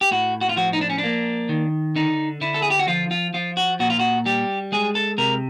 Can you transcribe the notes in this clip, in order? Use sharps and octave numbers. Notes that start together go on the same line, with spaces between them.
G4
A2 F#4
F#4
F4
F3 F#4
D#4
D4
C#4
D4
A#3
D#3
D3 D#4
D3 E4
A4
G#4
G4
F#4
F3 F4
F4
F3 F4
F#4
A#2 F#4
F4
F#4
G3 G4
G#3 G#4
A4
C3 A#4